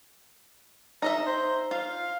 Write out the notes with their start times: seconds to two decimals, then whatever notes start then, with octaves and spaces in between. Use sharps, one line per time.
1.02 D#4 D#5 E5 A#5
1.27 C5
1.71 F4 F5